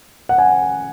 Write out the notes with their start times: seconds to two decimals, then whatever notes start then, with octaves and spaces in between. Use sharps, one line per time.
0.29 F#5
0.38 G#5